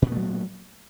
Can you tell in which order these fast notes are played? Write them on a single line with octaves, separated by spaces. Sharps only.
A#2 B3 A3 F#3